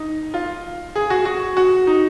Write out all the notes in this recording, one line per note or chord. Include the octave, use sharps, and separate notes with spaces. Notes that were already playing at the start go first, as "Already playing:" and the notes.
Already playing: D#4
F4
G#4
F#4
F#4
F#4
D#4